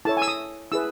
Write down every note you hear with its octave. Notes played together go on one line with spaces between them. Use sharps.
E4 A4 C#5 A5
G#5
E6
D#6
E4 G#4 B4 E6